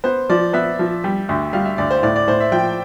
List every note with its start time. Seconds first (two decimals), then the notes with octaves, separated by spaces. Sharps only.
0.04 B3 C5
0.29 F3 D5
0.53 B3 E5
0.79 F3
1.04 G3
1.29 D2
1.53 G3 F5
1.65 E5
1.78 D2 D5
1.90 C5
2.03 A2 D5
2.16 D5
2.27 A2 C5
2.40 E5
2.52 F3 G5